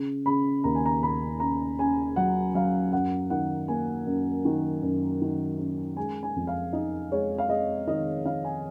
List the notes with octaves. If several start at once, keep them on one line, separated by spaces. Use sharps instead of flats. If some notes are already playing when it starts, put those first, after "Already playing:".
Already playing: C#3
C#3 B5
D#2 A#5
G#5
A#5
D#2 B5
C#4 A#5
C#4 G#5
F#3 F#5
F#3 F5
F#2 F#5
D#3 F#5
A#3 G#5
F#2
D#3
F#2
D#3
C#4
G#3 G#5
G#5
F2
F5
D#4 D#5
G#3 C#5
F5
G#3 D#5
D#3 D#5
D#3 F5
G#5